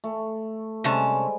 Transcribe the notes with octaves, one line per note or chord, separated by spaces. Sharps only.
A3
C3 G3 G#3 C#4 C5 A5